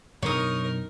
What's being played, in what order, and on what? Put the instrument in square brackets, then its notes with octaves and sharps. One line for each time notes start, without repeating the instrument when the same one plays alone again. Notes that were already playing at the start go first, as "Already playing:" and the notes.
[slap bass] F#2 B2 D4 [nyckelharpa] D#4 A#4 [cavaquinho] C#5 D#6